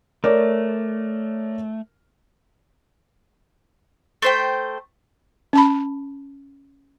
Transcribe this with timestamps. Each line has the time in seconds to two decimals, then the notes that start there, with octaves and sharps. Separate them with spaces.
0.24 A3 A#4 C#5 D5
4.22 A3 C5 G5
5.53 C#4 A5 B5